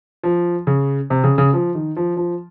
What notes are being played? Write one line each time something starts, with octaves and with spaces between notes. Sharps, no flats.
F3
C#3
C3
C#3
C#3
F3
D#3
F3
F3